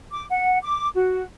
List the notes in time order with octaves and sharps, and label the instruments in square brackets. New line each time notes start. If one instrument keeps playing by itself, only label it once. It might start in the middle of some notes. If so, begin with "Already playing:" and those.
[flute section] D6
F#5
D6
F#4